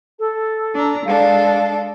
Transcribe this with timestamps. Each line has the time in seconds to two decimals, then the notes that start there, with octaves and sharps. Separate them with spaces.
0.19 A4
0.74 D4 A#5
1.06 G#3 D4 A4 F5